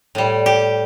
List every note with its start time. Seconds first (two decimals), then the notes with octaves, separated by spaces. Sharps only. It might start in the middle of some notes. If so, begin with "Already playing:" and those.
0.15 A2 G3
0.46 G4